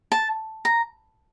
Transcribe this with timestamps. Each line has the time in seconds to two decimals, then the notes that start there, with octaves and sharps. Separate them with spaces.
0.12 A5
0.65 A#5